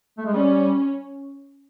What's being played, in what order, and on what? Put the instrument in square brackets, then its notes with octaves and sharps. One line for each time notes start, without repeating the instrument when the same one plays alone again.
[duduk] A3
G#3
[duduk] G3 [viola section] C#4